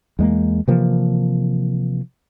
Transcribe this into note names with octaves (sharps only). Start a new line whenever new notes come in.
E2 G#3 A#3
C3 E3 F3 A#3